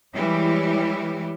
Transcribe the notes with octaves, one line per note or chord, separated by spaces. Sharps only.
E3 G3 G#3 E4 G4 C#5